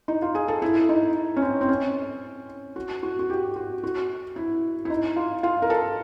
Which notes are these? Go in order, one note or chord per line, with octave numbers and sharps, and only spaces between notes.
D#4
F4
G#4
A4
E4
D#4
C#4
C4
C4
C#4
F#4
F#4
F#4
G4
F#4
F#4
E4
E4
D#4
F4
F4
A#4
A4